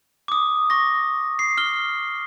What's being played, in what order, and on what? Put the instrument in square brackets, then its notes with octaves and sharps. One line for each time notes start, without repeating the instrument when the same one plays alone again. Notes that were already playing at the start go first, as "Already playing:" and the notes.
[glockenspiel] D6 D#6
C#6 A#6
C7
F6 G7